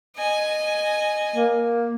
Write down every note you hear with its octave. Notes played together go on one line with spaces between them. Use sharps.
D#5 G#5
A#3